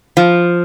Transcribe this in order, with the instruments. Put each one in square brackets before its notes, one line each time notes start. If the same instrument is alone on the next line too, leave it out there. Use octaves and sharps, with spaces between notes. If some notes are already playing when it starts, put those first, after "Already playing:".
[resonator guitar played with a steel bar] F3